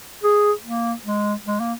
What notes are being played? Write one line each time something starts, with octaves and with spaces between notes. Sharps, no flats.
G#4
A#3
G#3
G#3
A#3